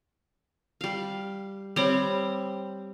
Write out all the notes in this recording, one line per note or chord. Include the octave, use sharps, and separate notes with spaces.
G3 F5
G3 C4 G4 C#5 B5